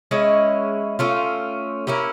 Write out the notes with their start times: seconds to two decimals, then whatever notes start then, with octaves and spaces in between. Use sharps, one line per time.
0.11 G#3 C#4 E4
0.99 A3 C#4 F4
1.87 A#3 C#4 E4 G4